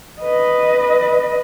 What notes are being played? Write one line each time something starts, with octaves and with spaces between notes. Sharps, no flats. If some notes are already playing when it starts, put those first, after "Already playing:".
B4 D#5